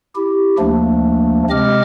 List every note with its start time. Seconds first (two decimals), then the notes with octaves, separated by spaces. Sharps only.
0.16 E4 G4
0.59 D2 F3 A3 A#3 D4
1.50 C3 G#3 C4 D#5 D6 F6